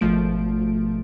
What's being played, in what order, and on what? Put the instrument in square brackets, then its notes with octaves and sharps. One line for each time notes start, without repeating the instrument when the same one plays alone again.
[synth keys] G#1 B2 F3 A3 D7